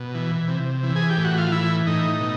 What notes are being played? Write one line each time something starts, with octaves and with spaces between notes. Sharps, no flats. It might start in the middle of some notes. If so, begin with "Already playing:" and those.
Already playing: B2
E3
C3
E3
G#4
G4
A2
F#4
F4
E3 E4
A2 D#4
B2